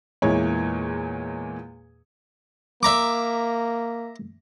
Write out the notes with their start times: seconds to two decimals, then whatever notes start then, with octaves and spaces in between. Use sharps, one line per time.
0.22 E2 A#2 G#3 E4 C#5
2.83 A#3 E5 A#5 D6